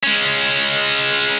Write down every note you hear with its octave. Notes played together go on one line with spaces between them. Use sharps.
G#3 C#4